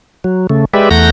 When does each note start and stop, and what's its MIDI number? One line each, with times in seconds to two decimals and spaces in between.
0.24 0.47 54
0.50 0.65 49
0.50 0.65 57
0.74 0.89 56
0.74 0.89 67
0.74 0.89 71
0.74 0.89 74
0.74 0.89 76
0.91 1.10 40
0.91 1.10 57
0.91 1.10 78
0.91 1.10 82
0.91 1.10 91
0.91 1.10 94